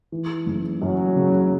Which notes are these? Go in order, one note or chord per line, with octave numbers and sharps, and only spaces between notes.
E3
F#1
F#2 F#3
C#3